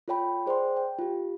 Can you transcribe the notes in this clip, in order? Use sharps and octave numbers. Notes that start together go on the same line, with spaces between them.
F4 A4 C#5 G5 B5
G#4 C5 D5 G5 C6
G5
F4 G4